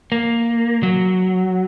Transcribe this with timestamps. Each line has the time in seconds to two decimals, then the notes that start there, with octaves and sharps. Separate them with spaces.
0.12 A#3
0.83 F#3